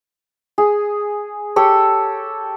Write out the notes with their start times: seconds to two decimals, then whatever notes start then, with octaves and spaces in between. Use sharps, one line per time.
0.58 G#4
1.56 G4 A4 C#5